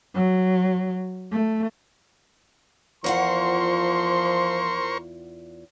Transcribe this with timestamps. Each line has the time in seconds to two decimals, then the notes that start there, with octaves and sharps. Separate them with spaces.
0.15 F#3
1.32 A3
3.04 E2 F3 F4 A#4 C5 F#5 C6 C#6